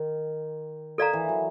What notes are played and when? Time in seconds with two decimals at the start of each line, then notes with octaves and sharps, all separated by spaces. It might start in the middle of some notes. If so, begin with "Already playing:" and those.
Already playing: D#3
0.98 D#3 A4 D5 F5 A#5
1.13 E3
1.29 F#3